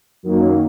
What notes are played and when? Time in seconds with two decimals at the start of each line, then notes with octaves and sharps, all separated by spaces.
0.23 F#2 D#3 F#3 A#3